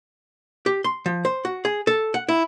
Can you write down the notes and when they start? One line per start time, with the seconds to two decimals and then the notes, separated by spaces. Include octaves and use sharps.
0.66 G4
0.84 C6
1.06 F3
1.25 C5
1.45 F#4
1.65 G#4
1.87 A4
2.14 F#5
2.28 E4